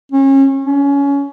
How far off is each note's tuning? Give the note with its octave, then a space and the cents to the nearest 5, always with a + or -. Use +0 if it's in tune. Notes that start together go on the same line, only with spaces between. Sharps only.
C#4 -30
C#4 +20